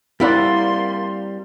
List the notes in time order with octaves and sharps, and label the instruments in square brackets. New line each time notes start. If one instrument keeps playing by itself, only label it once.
[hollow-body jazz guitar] G3 E4 F#5 [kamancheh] A#3 C6 [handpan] C4 D5